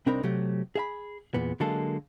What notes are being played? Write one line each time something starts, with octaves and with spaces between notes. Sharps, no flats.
C2 C4 D4 D#4 A#4 B5
C3 F#3 A3 G4
G#4 E5 B5
E2 A#2 B3
D3 F#3 G#3 A#3 A4